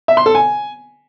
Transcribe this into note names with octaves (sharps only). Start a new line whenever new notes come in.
E5
C6
A4
G#5